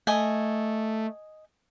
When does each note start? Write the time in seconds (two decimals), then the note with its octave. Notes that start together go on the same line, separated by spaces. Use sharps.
0.07 A3 D#5 G#5